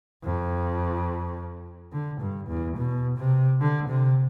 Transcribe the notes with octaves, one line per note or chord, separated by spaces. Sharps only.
F2
D3
G2
E2
B2
C3
D3
C3